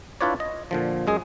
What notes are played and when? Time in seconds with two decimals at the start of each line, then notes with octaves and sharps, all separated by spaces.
0.21 D4 E4 F4 B4 C#5 D5
0.40 D#5
0.71 A#2 D3 F3
1.07 F#2 G#3 G#4